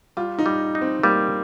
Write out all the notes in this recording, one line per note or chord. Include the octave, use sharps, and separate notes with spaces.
G3 F4
D#4
G3
D#4
C4
G3 A#3